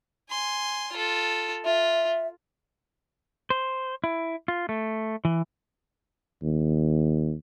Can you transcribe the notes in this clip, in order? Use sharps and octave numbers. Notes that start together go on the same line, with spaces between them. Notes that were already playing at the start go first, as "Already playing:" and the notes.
G#5 C6
F4 A4
F4 E5
C5
E4
F4
A3
E3
D#2